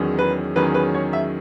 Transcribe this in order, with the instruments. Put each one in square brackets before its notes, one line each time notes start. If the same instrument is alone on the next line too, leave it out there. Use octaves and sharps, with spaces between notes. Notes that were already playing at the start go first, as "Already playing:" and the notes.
Already playing: [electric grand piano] E2 D#3 F#3 C#4 G#4
[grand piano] B4
[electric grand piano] E2 D#3 F#3 C#4 G#4 [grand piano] B4
[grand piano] B4
C#5
E5